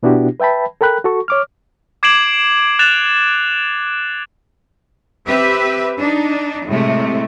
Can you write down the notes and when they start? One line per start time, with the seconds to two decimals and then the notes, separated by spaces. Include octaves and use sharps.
0.03 B2 B3 D4 E4 F#4 G4
0.40 B4 E5 G5 A5 B5
0.81 A4 A#4 G5 B5 F#6
1.04 F#4 A4 C#6
1.28 C#5 D6 F6
2.03 D6 G#6 C7 D7 E7 F#7
2.79 F#6 A6 E7 F7
5.26 C4 G4 B4 E5
5.98 D4 D#4
6.67 A2 C3 G#3 A3